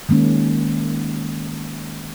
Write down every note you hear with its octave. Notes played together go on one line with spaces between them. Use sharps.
D#3 G#3 A#3 C#4